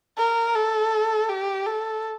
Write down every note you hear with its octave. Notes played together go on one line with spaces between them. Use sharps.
A#4
A4
G4
A4